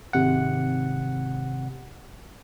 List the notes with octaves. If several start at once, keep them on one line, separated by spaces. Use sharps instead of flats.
G#1 C3 F#5